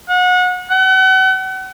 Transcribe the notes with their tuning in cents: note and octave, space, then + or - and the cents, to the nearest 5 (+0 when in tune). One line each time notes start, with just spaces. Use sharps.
F#5 -30
F#5 +35